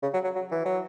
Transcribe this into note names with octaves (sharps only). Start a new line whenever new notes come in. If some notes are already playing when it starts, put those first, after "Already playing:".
C#3
F#3
F#3
F#3
E3
F#3